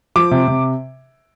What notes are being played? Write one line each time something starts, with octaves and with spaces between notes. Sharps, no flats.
F3 D6
C3
C3